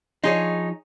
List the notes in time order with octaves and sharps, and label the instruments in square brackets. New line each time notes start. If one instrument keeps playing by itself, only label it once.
[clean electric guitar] F3 C6 [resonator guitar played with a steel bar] D#4 G#4 C#5